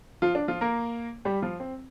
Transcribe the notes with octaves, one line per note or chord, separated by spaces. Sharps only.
F3 F4
D4
F3 F4
A#3 A#4
G3 G4
F3 F4
C4